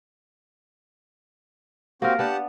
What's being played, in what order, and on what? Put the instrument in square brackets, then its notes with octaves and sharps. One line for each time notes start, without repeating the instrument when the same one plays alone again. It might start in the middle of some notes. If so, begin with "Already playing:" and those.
[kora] A#3 A#4 [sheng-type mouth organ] C4 F#4 G4
[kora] B3 D4 [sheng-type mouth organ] G4 F#5 A5